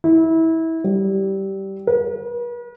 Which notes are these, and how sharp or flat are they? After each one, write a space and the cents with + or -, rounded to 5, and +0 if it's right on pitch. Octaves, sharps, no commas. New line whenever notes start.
E4 -25
G3 -15
B4 -45